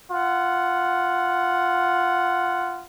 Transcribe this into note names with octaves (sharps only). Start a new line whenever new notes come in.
F4 F#5